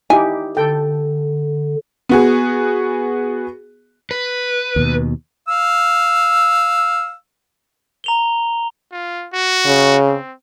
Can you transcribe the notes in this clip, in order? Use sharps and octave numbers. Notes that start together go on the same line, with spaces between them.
D#4 E4 G4 G#5
D3 A4 G5
B3 F#4 G#4
B4
D#2 B2
F5 E6
A#5 F7 G7
F4
F#4
C#3
C4